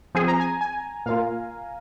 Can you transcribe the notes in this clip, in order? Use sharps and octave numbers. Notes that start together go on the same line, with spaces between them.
F3 C4 G#4 G#5
A#5
G#5
G#5
A#2 A#3 F4 F5